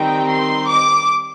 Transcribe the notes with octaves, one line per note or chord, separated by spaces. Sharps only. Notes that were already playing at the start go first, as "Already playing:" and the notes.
Already playing: D#3 G3 C4 D#4 G5
C6
D6